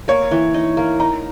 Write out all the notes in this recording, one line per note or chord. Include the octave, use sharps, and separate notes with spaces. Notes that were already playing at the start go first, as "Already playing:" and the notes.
A#3 C#5
E3
D#4
A#3
D#4 A#5